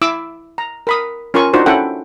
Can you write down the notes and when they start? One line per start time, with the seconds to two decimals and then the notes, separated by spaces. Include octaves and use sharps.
0.02 E4 D6 E6
0.58 A#5
0.87 A#4 B5 D#6
1.34 C#4 F4 A#4 G#5 C#6
1.53 D4 D#4 F4 F#4 C5
1.66 C#4 E4 A4 F#5 G5